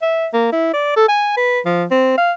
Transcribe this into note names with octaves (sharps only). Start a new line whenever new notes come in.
E5
A#3
E4
D5
A4
G#5
B4
F3
C4
F5